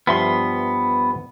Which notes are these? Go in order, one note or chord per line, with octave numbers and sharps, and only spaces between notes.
G2 F3 B3 E5 C6